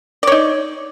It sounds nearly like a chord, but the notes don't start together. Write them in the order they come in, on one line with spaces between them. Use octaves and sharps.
D5 C#5 D#4